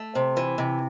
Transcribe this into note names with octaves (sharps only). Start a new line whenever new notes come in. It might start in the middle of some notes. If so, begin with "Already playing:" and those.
Already playing: A3
C3
E3
C3